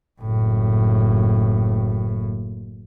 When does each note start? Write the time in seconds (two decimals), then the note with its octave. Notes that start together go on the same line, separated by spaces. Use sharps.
0.21 F#1 A2